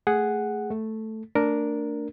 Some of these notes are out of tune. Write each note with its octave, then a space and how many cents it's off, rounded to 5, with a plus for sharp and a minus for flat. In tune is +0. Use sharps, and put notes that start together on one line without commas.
A3 +5 G#4 +0 F#5 +0
A3 +0 A4 +0
A3 +25 D4 -5 A#4 +0